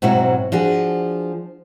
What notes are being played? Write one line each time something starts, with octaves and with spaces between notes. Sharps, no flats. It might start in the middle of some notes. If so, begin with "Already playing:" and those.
G#2 B2 F#3 C4 E4 F#4
F3 D4 F#4 G#4